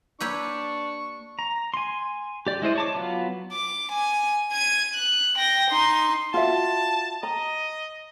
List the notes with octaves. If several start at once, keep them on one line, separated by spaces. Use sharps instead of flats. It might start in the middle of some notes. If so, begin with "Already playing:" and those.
A#3 D4 G4 B4 C#5 C#6 E6
A#5
G#5 C6
G4 D5
G#3 E4 C5 D#5
C#5 A5 D6
F#3 B3 F4
D6
G#5
G#6 D#7
F#6
G5 A#6
D#4 C6
F4 F#4 E5 A5
D#5 A#5